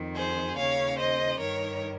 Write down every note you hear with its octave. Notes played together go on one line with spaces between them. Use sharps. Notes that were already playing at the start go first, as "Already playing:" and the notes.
Already playing: F2 D#3
G#4 C5
D#2 C#3 C#5 F5
C5 D#5
G2 D#3 A#4 C#5